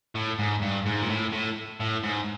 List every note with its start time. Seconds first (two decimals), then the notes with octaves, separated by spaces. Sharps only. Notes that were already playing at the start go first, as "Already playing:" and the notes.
0.15 A2
0.39 G#2
0.62 G2
0.86 G#2
1.02 A#2
1.09 A2
1.33 A2
1.80 A2
2.03 G#2